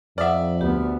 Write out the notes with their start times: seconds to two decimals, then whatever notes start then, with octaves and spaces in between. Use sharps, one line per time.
0.18 F2 D5 E5 F#5 D#6 F6
0.61 D2 B3 G4